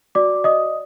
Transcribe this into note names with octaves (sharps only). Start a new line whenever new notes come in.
F#4 D5 D6
D5 D#5 D#6